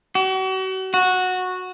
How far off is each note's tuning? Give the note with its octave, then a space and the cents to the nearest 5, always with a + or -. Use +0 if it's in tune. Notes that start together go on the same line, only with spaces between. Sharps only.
F#4 +40
F#4 -10